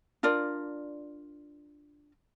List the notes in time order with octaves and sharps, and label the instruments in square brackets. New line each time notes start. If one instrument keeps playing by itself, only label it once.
[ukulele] D4 F4 A#4 D5